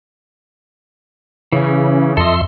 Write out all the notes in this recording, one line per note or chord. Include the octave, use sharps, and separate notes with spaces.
C#3 E3 C#4
F2 A4 D#5 E5 C6